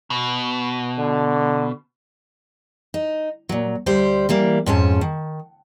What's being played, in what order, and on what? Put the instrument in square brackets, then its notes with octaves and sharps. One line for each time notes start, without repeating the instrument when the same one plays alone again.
[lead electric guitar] B2
[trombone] D3
[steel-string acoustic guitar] D#4
A#2 F#3
D2 G3 G4 C5
E3 G3 A#3
F2 G#2 C#4 A5
D#3